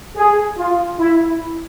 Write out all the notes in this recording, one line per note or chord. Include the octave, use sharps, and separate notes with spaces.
G#4
F4
E4